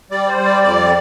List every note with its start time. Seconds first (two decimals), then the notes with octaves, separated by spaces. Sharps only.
0.11 G3 D5
0.28 C5
0.37 G3
0.46 D5
0.63 F2 D5